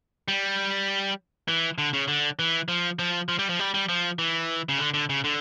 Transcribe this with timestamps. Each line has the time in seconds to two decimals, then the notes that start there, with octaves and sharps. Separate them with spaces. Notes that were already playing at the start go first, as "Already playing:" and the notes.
0.28 G3
1.48 E3
1.78 D3
1.93 C#3
2.08 D3
2.39 E3
2.68 F3
2.99 F3
3.29 F3
3.39 G3
3.49 F3
3.59 G3
3.74 G3
3.89 F3
4.19 E3
4.69 C#3
4.79 D3
4.94 D3
5.10 C#3
5.24 D3